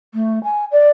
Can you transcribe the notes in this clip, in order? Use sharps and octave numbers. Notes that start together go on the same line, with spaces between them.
A3
G#5
D5